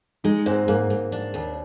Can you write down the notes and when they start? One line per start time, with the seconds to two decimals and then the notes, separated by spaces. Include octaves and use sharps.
0.24 G#3 D#4
0.46 G#2 C4
0.68 G#2 A#3
0.90 G#2
1.12 D4
1.34 D#2